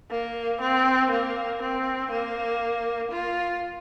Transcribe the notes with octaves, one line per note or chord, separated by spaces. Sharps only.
A#3
C4
A#3
C4
A#3
F4